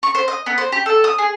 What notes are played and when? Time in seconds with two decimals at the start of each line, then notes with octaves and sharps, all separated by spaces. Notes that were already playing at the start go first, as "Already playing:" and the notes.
0.03 C#6
0.15 C5
0.28 D#5
0.46 B3
0.58 C5
0.72 G4
0.86 A4
1.04 D#6
1.18 G#4